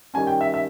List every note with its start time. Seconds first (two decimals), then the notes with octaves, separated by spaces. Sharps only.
0.14 D#3 G3 C#4 G#5
0.27 G5
0.41 E5
0.54 E5